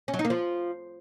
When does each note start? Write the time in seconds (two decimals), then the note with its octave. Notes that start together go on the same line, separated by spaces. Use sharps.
0.08 C#4
0.14 F#3
0.19 D#4
0.25 A#3
0.30 F3